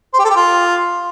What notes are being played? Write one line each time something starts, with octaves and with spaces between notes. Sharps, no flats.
C5
G4
A4
G4
F4